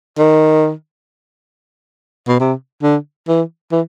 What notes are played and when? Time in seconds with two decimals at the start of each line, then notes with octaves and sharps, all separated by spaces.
0.18 D#3
2.28 B2
2.40 C3
2.83 D3
3.28 E3
3.72 E3